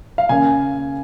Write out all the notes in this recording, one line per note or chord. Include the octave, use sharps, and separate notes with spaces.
F5
C#3 A#3 C#4 G#5